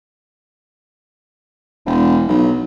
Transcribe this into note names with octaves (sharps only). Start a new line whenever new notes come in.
E1
B1